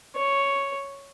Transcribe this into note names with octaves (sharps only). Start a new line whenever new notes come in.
C#5